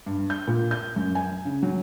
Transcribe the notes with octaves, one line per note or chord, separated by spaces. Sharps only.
G2
G6
A#2
G6
F#2
G#5
C#3
F#3